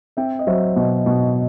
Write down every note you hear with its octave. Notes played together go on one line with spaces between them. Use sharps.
C4 E5 G5
D#5
F#3 C5 E5
B2
B2